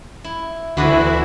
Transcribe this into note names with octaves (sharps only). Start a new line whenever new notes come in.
E4
D2 D3 E3 B3 E4 F#4 B5